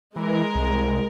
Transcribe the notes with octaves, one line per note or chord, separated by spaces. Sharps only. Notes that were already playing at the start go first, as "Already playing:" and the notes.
E3 G#3 A#4
C2